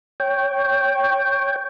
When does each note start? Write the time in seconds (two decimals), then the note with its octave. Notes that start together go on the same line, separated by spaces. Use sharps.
0.20 C#5 G5